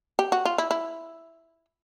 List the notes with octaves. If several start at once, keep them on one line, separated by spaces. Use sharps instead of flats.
G4
F#4
F4
E4
E4